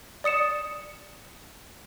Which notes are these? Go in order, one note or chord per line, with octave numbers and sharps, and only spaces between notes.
D5 D#6 C#7 E7